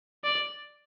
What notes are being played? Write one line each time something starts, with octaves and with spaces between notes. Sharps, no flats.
D5